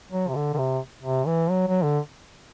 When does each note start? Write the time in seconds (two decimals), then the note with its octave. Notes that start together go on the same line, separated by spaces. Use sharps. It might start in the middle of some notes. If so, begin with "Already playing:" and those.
0.12 F#3
0.28 C3
0.35 D3
0.54 D3
0.58 C3
1.03 C3
1.27 E3
1.50 F#3
1.67 F#3
1.84 D3